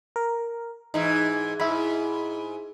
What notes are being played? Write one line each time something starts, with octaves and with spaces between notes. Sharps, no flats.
A#4
G#2 E3 D#4
G#2 E4 E5 B5